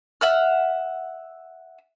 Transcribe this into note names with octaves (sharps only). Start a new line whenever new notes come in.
E5 F#5 F6